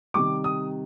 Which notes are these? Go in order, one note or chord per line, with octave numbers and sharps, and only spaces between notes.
C3 D#3 G3 D6
D#6